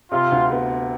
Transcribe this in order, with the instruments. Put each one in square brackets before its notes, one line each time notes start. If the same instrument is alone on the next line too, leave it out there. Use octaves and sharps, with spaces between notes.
[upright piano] C3 [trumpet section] F4
[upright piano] D2
B3